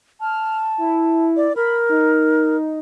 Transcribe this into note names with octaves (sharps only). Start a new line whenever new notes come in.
A5 F6
E4
D5
A#4 B5
D#4